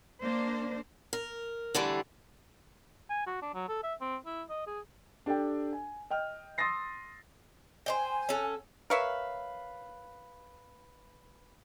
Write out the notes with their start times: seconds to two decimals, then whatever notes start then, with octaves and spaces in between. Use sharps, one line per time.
0.22 A#3 D4 C5
1.13 A#4
1.75 D3 E3 G3 A3
3.10 G#5
3.27 F#4
3.42 D4
3.54 F#3
3.69 A4
3.83 E5
4.01 C4
4.26 E4
4.49 D#5
4.67 G#4
5.26 D4 G4 A4 G5
5.73 G#5
6.10 D#5 G5 F6
6.58 C6 D#6 E6 A6 A#6 C7
7.86 C5 D5 G5 G#5
8.29 C#4 A4 F#5
8.90 A#4 B4 C#5 E5 F5